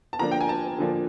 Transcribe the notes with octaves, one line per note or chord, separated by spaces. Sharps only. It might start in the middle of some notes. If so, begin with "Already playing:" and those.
A5
D3 F3 A#3 D4 A#5
G5
G#5
A5
D3 F3 A#3 D4